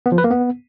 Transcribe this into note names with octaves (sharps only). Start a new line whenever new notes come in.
B3
F3
B4
A#3
B3